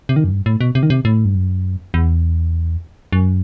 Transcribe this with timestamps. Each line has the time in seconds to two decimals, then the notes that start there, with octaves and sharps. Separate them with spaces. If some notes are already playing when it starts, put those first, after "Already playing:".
0.09 C3
0.16 D#3
0.24 F#2
0.31 G2
0.46 A2
0.61 B2
0.75 C3
0.83 D#3
0.90 C3
1.05 A2
1.25 G2
1.35 F#2
1.94 E2
3.12 F#2